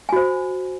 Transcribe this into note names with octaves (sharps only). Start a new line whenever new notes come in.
F#4 C5 G#5